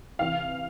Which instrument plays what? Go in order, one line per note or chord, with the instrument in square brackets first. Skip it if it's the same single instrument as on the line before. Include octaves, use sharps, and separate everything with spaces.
[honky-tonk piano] C3 E3 F5